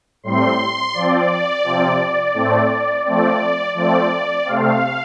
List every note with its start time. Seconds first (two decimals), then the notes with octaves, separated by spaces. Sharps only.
0.23 A2 G3 C4 C6
0.94 F3 C4 D5
1.64 C3 F3 C4
2.34 A2 A3 C4
3.05 F3 A3 C4 D5
3.75 F3 A3 C4 D5
4.45 C3 A3 C4 F5